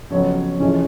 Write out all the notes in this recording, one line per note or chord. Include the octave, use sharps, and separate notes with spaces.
F2 C#3 F#3 B3 C#5
F2 C3 E3 G#3 C#4